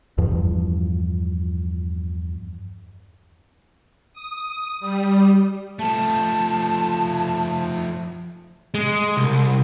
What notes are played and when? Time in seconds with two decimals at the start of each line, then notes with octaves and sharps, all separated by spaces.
0.18 E2 G2 F3
4.14 D#6
4.80 G3
5.79 F3 A3 A5
8.74 G#3
9.17 C2